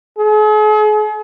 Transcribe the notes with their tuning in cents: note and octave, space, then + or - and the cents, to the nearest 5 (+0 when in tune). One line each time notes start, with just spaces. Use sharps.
G#4 +45